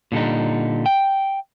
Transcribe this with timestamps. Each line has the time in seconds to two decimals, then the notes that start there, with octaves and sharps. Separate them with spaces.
0.12 A#2 D3 G3 D#4
0.86 G5